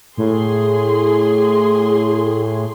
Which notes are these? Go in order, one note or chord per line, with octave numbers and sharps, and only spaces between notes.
A2 G#4 C6